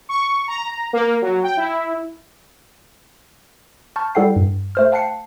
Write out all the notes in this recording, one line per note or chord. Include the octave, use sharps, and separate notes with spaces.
C#6
A#5
A#3
F#3
G5
E4
A5 B5 C#6 F6 G6 A6
G3 E4 A4 F#5 G5 C7
G2
A3 C5 F6
F5 G5 A5 F#6 C7 C#7